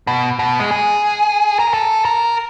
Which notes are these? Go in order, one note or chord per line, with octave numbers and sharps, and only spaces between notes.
B2
B2
G#3
G#4
A#4
A4
A#4